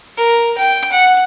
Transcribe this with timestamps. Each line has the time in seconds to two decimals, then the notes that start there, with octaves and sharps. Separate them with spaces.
0.17 A#4
0.58 G5
0.92 F#5